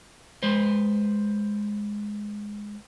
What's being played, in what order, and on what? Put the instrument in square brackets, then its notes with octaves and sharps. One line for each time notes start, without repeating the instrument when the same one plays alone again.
[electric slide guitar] G#3 B4 C5